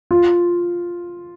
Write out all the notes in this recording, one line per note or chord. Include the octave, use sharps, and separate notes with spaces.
F4